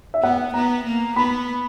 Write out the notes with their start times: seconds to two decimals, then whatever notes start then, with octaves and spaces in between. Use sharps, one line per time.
0.14 E5
0.23 B3 F#5
0.54 B3 A#5
0.86 A#3
1.16 B3 B5